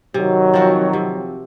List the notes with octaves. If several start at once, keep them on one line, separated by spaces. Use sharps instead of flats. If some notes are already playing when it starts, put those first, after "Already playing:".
C3 D#3 F#3
F3 C4 F#4
C3